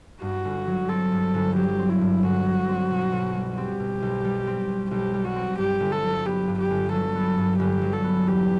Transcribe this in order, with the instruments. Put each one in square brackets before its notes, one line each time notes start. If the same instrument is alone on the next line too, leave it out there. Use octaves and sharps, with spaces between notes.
[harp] G2 [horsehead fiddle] F#4
[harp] G1
F#3
[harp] C4 [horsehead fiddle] A4
[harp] G2
G1
[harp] F#3 [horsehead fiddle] G4
[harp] C4
[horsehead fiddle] E4
[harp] G2
[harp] G1 [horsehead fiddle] F#4
[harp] F#3
C4
B2
B1
G3
[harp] C4 [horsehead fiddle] G4
[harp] B2
B1
G3
C4
B2
[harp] B1 [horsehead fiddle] G4
[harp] G3
[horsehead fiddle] F#4
[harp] C4
[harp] G2 [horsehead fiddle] G4
[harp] G1
[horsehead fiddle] A4
[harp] F#3
[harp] B3 [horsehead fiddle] G4
[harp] G2
[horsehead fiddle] G4
[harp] G1
[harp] F#3 [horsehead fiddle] A4
[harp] B3
G2
[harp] G1 [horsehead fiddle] G4
[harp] F#3
[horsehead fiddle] A4
[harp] B3
[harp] E2 [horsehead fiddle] G4